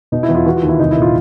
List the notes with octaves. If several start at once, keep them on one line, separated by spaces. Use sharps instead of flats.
B2 D#4
E4
E2
F4
E3 F#4
F4
D#2
E4
C2 D#4
E4
A#2
F4